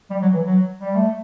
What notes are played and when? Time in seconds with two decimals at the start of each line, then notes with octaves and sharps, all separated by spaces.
0.10 G3
0.22 F#3
0.34 E3
0.46 F#3
0.81 G3
0.96 A3